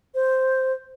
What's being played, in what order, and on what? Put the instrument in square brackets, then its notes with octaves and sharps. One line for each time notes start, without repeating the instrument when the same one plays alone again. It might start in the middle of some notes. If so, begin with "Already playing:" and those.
[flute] C5